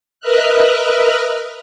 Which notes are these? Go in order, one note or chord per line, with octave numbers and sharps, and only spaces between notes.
A#4 B4 D#5 E5 F6 F#6